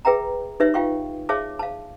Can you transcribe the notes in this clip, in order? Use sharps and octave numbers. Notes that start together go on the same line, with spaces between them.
G#4 B4 E5 G5 A#5
D#4 G4 B4 C#5 E5
F4 F5 G5 C#6
G#4 C#5 E5 F5 A5 D6
F5 A5